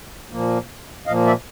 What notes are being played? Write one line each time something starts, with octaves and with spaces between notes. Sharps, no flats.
A#2 F3 A#3
A#2 F3 A#3 D#5 F5
D5 E5